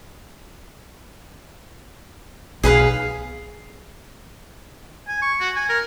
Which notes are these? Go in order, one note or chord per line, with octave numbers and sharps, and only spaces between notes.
B1 G#4 B4 F5
G#5
C#6
F#4
G#5
A#4